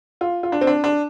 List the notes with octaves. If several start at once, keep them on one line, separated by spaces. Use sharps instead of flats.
F4
F4
D4
C4
D4
D4